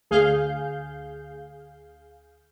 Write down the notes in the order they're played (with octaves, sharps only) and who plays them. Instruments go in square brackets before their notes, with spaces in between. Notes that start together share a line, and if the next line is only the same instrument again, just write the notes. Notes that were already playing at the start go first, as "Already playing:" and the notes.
[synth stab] D2 G#4 F5 G6